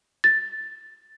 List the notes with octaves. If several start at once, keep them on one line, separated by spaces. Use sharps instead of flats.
A6